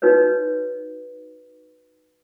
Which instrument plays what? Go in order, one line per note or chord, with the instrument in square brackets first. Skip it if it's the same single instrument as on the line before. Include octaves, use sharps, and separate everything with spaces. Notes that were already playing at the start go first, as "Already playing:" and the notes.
[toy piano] D#4 F#4 B4 C#5